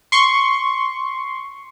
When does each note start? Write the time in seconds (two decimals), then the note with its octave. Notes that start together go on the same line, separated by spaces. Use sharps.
0.12 C6 C#6